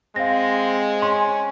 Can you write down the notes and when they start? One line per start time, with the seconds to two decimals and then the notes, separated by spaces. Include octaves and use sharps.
0.16 G#3 C4 F5 A#6
1.02 C#4 C6